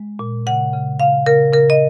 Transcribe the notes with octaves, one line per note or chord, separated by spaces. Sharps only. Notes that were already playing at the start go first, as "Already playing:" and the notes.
Already playing: G#3
A#2
C#3 F#5
C#3
C#3 F5
C#3 A#4
C#3 A#4
D#5